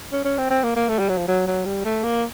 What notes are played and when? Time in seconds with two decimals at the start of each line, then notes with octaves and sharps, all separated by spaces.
0.12 C#4
0.25 C#4
0.38 C4
0.50 C4
0.64 A#3
0.76 A#3
0.89 A3
0.99 G3
1.09 F#3
1.18 F3
1.28 F#3
1.47 F#3
1.65 G3
1.85 A3
2.04 A#3